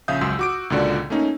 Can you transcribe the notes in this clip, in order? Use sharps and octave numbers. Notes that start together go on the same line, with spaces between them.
A#1 C#3 E5 F5 D#6 G6
C#2 F#2 F#4 C6 E6
F#4 D6 D7
C#2 A#2 D3 F#4 D5
A3 A#3 C#4 D#4